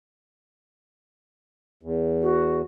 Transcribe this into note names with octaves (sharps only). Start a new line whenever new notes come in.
E2
F#4